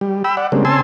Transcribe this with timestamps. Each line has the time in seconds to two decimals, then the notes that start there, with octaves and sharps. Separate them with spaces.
0.01 G3
0.24 G5 B5 E6
0.37 D5 F#5
0.52 C#3 G3 G#3 A#3 C4 D4
0.65 C#3 C4 G#5 A5 C6 E6